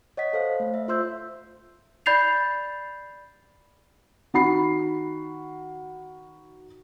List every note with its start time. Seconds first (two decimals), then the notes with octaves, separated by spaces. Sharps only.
0.17 C#5 D#5 F#5 B6
0.33 A4 C5 F5
0.60 A3
0.74 E5
0.88 F4 C5 C6 E6 G6
2.06 D5 B5 G6 A6 C7 F7
4.34 D#3 F#4 B5 C7